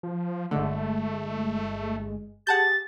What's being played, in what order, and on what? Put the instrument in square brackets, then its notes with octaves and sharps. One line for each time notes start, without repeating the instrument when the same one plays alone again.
[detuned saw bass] F3
[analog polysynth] G1 G#3 [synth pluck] D3 [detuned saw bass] A3
[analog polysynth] G4 G#4 [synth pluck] F#5 A5 G6 [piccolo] A6